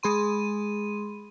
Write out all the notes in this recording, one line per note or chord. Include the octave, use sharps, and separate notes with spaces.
G#3 G#4 B5 C6 D#7